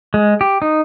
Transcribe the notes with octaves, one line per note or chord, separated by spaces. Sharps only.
G#3
G4
D#4